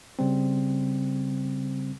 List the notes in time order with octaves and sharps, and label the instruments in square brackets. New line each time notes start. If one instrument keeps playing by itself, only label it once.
[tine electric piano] C#3 G3 C4